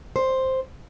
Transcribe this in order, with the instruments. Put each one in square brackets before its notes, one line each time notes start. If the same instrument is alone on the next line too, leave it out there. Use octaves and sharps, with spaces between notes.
[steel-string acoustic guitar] C5